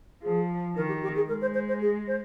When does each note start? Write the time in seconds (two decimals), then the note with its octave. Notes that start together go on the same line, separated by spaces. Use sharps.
0.22 F3 G#4
0.76 D#3 A#4
0.88 G4
1.02 G4
1.15 G#4
1.28 G#3 A#4
1.41 C5
1.54 C5
1.68 C5
1.80 G#4
2.07 C5